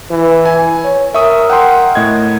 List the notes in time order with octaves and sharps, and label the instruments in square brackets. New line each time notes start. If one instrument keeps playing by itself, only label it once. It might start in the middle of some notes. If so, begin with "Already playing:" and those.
[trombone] E3
[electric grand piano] G#5
[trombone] C#5
[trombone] A#4 [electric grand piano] E5 C#6 D#6
[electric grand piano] F#5 G5 C6
A2 D#5 G#6